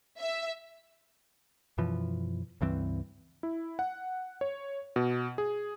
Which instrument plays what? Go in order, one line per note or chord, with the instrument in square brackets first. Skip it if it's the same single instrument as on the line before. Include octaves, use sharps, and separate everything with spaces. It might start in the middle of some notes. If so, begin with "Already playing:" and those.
[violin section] E5
[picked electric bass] F#2 B2 E3 F3
C#2 G2 E3 C4
[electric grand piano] E4
F#5
C#5
B2
G#4